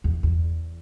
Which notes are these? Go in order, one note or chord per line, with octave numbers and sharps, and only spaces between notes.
E2
E2